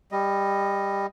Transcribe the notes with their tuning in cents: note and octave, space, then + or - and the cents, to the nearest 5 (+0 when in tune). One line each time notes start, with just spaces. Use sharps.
G3 +15 D#5 +0